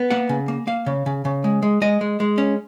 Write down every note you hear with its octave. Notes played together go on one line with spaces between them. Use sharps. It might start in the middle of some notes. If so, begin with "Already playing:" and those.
Already playing: B3
A#3 F#5
C#3
A#3
A#3 F5
C#3
C#3
C#3
G#3
G#3
G#3 D#5
G#3
G#3
C#4